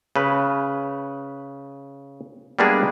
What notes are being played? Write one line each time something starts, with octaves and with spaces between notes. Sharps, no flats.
C#3 B4
G3 G#3 A#3 B3 D4 G#4